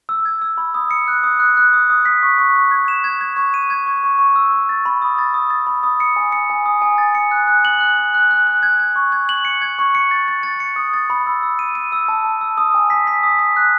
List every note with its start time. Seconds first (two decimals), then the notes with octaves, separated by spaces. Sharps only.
0.09 E6
0.25 G#6
0.42 E6
0.58 B5
0.74 D#6
0.91 C#7
1.08 F#6
1.24 D#6
1.40 F#6
1.57 F#6
1.73 D#6
1.90 D#6
2.05 B6
2.23 C#6
2.38 C#6
2.56 C#6
2.71 G#6
2.88 E7
3.04 G#6
3.21 G#6
3.37 C#6
3.54 D#7
3.70 G#6
3.86 C#6
4.04 C#6
4.19 C#6
4.36 E6
4.52 C#6
4.69 A6
4.86 B5
5.02 D#6
5.18 A6
5.34 D#6
5.50 A6
5.67 B5
5.83 D#6
6.00 C#7
6.16 G#5
6.32 C#7
6.50 G#5
6.66 D#6
6.82 G#5
6.98 A6
7.15 C#7
7.31 F#6
7.47 F#6
7.65 F#7
7.81 F#6
7.97 F#6
8.14 F#6
8.31 F#6
8.47 F#6
8.63 G#6
8.79 G#6
8.96 C#6
9.12 G#6
9.29 F#7
9.45 C#7
9.62 G#6
9.79 C#6
9.95 C#7
10.11 A6
10.28 A6
10.43 A6
10.60 C#7
10.76 D#6
10.94 A6
11.10 B5
11.27 E6
11.43 E6
11.59 D#7
11.75 D#7
11.92 E6
12.08 A5
12.25 A5
12.41 E6
12.58 D#6
12.75 G#5
12.90 B6
13.07 B6
13.23 D#6
13.39 B6
13.57 F#6